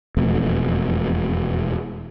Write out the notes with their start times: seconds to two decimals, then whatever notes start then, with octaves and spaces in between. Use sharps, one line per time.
0.17 E1 F2 B2 A3